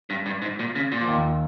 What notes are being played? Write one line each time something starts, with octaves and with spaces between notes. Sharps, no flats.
G2
G2
G#2
A#2
C#3
A#2
F3
D#2 D#3